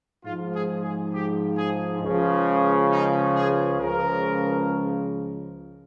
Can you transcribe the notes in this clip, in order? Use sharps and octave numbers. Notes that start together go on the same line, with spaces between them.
G#2 F3 F4
G#4
G#4
G4
G#4
C#2 C#3 F3
D#4
G#4
C#2 C#3 F3 A#4